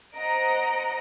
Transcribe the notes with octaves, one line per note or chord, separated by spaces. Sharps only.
C5 D#5 F#5 A#5 D7